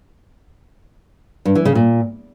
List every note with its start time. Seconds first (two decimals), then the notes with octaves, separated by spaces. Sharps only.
1.45 G2
1.55 E3
1.65 C#3
1.75 A#2